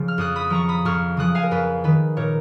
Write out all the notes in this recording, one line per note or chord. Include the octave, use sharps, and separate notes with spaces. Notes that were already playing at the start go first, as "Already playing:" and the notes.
Already playing: C#3 F3
F6
F2 D#6 F#6
B5 D#6
F3 A#5 C#6
B5 D#6
F2 C#6 F6
C#3 F3 D#6 F#6
F5 G#5
A#4
F2 B4
D#3 B4
A#2 A#4 C#5